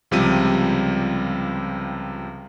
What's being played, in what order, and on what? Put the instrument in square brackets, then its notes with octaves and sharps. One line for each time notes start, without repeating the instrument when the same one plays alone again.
[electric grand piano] C#2 C3 F3 G3 D#7